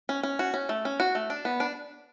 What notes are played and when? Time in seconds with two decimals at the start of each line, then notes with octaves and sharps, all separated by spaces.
0.09 C#4
0.23 C#4
0.39 F#4
0.54 C#4
0.69 A3
0.85 C#4
1.00 F#4
1.15 A3
1.30 D4
1.45 B3
1.60 D4